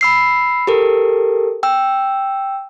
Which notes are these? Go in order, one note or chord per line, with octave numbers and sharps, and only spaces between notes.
B5 E6 C7
G4 A4 A#4
G5 E6